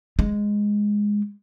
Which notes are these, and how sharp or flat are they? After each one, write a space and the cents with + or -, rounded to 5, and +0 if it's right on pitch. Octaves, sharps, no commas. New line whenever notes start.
G#3 -5